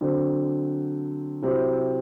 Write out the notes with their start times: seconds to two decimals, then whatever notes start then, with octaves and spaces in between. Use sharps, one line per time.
0.01 D3 F#3 C4
1.42 C3 F#3 C4 E4